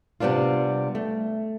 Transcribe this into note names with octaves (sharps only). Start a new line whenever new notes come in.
C3 G3 B3 D4 F4
A3